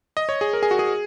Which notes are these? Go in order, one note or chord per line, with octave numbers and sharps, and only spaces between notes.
D#5
C#5
G#4
A#4
G#4
F#4
G#4